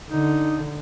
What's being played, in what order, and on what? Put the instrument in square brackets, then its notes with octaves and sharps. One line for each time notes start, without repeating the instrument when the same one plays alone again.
[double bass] D3 [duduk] D#4